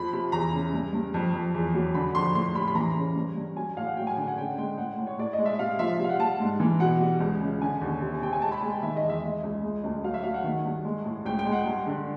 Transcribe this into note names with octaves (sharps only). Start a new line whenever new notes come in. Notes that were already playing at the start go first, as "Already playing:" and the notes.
Already playing: F2 F3 B5
C3 B5
E2 A#5
C#3
G2
G2
F2
F2
E2
F#3
D3 B5
F2 C6
A2 C6
G3 B5
B5
E3 A#5
C#3
G2
G2
F#3 G#5
A2 F5
F#5
F#3 G5
G#5
D3 G#5
F#5
C#3 G5
G#3 G5
A2 F#5
A2
C#5
A2 D5
D#5
G#3
E5
C3 F5
F3 E5
G3
F5
F#5
G3 A5
G#2
E3
B2 F#5
G3
C#2
C#3
D3 G#5
D#2
C3
C3 G5
G#5
G#3 A5
B5
G#3 G#5
G5
D#3 E5
D#5
E2
E5
G#3 D#5
C#2
G#3
D2
F#3 F5
E5
F#3 F5
F#5
D#3
G2
G#3
A2
C#2 G5
G5
G#3
F#5
G2
D3